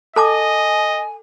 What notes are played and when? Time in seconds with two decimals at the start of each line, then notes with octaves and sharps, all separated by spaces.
0.16 A4 D#5 G#5 A5 D6